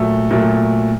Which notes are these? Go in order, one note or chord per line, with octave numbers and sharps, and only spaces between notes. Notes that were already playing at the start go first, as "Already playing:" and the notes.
Already playing: A#2 F#3 A3
A#2 F#3 A3